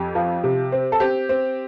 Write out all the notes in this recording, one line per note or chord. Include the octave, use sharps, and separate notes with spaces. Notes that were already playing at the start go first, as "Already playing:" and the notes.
Already playing: F2 G4
F3
C3
C4
A4
C4 G4
C4